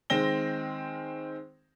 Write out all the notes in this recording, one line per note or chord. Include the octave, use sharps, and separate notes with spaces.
D#3 G#3 C4 A#6 G7